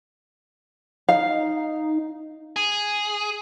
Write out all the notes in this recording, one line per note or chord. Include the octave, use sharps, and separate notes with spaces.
D#4 F5
G#4